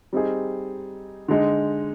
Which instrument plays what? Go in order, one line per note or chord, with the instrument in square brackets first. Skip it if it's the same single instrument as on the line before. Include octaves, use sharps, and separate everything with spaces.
[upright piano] G3 C4 D#4 G#4
D3 G#3 D#4